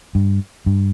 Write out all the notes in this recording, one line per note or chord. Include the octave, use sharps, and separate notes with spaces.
G2
G2